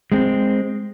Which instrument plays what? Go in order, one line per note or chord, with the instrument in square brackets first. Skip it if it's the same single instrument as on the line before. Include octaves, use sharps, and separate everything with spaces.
[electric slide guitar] G#3 C4